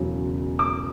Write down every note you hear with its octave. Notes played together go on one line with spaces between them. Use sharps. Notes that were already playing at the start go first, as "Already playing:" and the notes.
Already playing: E1 E2 C#3 F#3
D6